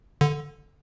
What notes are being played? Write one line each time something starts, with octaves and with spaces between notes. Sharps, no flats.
D3